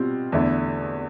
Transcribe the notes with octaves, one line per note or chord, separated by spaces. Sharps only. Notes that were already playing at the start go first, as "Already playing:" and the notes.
Already playing: B2 G3 C4 F4
E2 D3 A3 E4